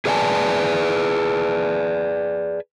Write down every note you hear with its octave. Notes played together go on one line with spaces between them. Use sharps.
G#4 B4 D5 F#5 G#5 A5